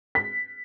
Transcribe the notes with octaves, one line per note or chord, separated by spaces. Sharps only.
B6